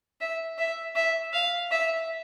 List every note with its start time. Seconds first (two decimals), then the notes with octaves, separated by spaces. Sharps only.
0.21 E5
0.59 E5
0.96 E5
1.34 F5
1.71 E5